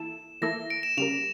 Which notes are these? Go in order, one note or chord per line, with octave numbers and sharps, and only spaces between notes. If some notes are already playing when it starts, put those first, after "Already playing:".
Already playing: E3 A#3 E4 A4 E7
E3 A#3 E4 A4 A#6
D7
E7
C#3 G3 A#3 F7